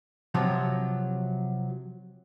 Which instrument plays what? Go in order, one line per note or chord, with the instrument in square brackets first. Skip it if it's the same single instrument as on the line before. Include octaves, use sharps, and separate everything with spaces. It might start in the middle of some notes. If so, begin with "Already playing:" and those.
[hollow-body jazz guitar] C3 F3 F#3